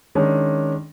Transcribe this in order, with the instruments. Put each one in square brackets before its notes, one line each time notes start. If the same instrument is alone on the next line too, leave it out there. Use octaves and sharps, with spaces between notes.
[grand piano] D#3 G#3 C#4 D4